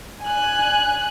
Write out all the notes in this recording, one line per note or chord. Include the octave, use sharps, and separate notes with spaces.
G#5 F#6